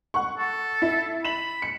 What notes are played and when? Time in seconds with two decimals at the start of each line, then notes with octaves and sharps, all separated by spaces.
0.14 F#5 C#6
0.37 A4
0.82 E4
1.25 B5 E7 F#7
1.62 C#7